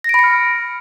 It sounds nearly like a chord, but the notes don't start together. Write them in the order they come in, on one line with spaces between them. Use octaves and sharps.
A#6 D7 B5 C#7 F6